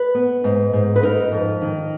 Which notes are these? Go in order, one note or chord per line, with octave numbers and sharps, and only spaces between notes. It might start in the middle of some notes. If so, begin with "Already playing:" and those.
Already playing: B4
B3
G#2
G#2
B4
D#4 A#4
F2
D#3